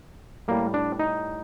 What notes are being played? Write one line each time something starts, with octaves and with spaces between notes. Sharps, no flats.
A2 G3 A#3
D4
D#4